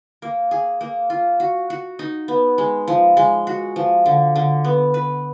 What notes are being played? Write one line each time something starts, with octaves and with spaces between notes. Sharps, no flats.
A#3
G#4
A#3
F4
F#4
F#4
D#4
B3
G#3
F3
G#3
F#4
F3
D3
D3
B3
B4